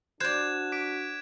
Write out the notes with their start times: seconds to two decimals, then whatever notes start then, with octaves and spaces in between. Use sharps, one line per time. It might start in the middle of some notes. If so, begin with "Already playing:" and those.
0.20 D4 F#4 C5 D5 F#6 G#6 E7
0.72 D6 B6 D7